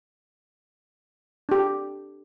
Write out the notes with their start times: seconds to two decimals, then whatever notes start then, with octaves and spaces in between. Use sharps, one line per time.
1.49 D4 G4